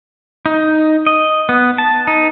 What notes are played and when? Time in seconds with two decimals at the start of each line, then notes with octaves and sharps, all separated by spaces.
0.46 D#4
1.06 D#5
1.49 B3
1.78 A5
2.07 D#4